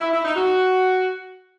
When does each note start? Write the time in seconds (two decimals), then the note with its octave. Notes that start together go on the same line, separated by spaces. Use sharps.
0.01 E4
0.13 E4
0.25 D#4
0.36 F#4